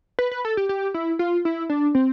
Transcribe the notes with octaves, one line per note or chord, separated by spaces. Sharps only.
B4
B4
A4
G4
G4
E4
F4
E4
D4
C4